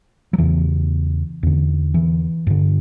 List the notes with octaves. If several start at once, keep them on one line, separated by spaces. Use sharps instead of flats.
F#3
E2 C#3 E3
E2 D3
E3
G2 D3